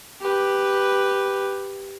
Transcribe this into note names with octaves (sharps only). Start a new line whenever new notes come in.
G4 B4